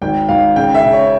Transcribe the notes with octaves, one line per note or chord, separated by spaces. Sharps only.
G#1 G5
G#1 F5
C#3 G5
E5
C#3
C#5